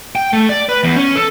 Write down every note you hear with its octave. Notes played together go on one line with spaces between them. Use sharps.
G5
A3
D5
B4
E2
C#4
A4